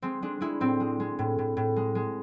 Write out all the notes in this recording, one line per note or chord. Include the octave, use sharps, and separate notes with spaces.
G#3 C4
G#3 D4
G#3 E4
A2 C4
G#3
G#3
A2
A2
A2
G#3
G#3